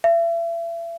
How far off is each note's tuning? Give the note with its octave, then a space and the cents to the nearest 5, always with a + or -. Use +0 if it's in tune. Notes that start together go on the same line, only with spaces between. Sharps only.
E5 +35